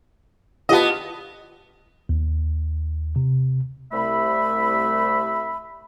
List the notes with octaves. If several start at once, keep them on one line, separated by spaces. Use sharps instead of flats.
B3 F4 G4 D#5 A5
D#2
C3
C2 A3 E5 B5